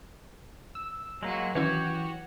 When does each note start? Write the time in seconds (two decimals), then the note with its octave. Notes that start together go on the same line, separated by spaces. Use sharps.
0.75 E6
1.23 F#3 G#3 A#3 F4 F#4
1.55 D#3 E3 C#4 E4 F#4 G4 C#5